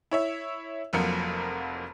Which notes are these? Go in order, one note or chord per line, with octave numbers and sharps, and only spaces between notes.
E4 C#5 E5
F1 F2 F3 F#3 A#3 C#7